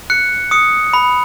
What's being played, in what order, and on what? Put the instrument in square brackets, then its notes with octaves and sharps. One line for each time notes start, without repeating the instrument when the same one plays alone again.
[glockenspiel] F#6 C#7
D#6 C#7
B5